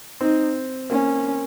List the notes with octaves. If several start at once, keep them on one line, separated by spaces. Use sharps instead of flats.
C4 D#4
A#3 C#4